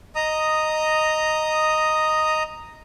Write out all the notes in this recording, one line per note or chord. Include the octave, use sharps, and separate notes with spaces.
D#5 A#5 D#6